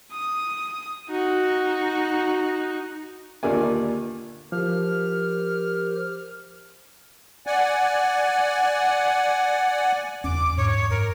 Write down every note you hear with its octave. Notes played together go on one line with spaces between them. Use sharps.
D#6
D#4 F#4
D#2 A#2 D3 A#4 D5 G#5
F3 G4 A#4 C5 F6
D5 F#5 G#5
F#1 E2 C#4 D6
G#2 C#5
F#2 A#4